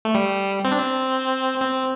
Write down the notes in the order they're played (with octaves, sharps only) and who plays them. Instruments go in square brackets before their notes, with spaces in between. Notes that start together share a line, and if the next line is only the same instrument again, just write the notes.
[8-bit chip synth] A3
G3
C4
D4
C4
C4